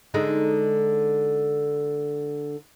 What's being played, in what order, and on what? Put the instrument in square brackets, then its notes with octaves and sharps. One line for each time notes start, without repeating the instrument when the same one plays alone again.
[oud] D3 G#3 D#4